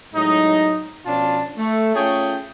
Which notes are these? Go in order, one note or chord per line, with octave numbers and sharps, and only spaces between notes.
A2 F#3 G#3 D#4
B2 F3 C#4 D4 F4 A5
A3
A3 C#4 F4 G#4 C#5 G5